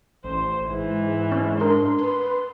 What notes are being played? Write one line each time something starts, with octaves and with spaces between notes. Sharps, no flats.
A1 C5
G#2 E3
C#4
D4 A#4 C6
B4